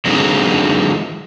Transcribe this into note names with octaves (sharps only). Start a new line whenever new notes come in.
D3 E3 F#3 G#3 C4 D#4